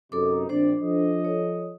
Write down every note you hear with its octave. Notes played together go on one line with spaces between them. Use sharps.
F#2 C3 D#4 A4 D6
A#1 C4 D4 C5 D5
F3 A4 D#5
C#5